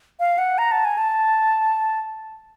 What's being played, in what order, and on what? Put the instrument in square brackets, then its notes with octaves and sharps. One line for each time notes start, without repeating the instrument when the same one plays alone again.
[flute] F5
F#5
A#5
A5
G#5
A5